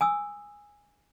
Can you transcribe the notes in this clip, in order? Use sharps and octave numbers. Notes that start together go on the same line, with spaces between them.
G#5 D#6 E6